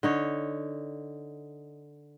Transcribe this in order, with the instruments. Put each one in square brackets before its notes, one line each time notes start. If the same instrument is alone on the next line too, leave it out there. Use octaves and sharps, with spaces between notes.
[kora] D3 D#4 C#5